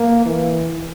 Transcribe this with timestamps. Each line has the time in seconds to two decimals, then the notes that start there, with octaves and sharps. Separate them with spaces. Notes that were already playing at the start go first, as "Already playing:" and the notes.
Already playing: A#3
0.26 E3